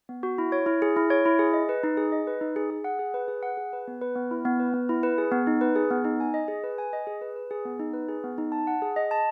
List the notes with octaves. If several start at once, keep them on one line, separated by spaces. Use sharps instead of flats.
B3
F#4
E4
C#5
E4
G#4
E4
C#5
E4
G#4
D#5
B4
D#4
G#4
D#5
B4
D#4
G#4
G#4
F#5
G#4
B4
G#4
F#5
G#4
B4
B3
B4
B3
E4
B3
B4
B3
E4
B4
G#4
B3
D#4
B4
G#4
B3
D#4
G#5
D#5
G#4
B4
G#5
D#5
G#4
B4
B4
G#4
B3
D#4
B4
G#4
B3
D#4
A5
F#5
G#4
D#5
A5